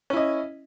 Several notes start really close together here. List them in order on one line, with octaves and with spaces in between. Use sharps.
C#4 E4 D#5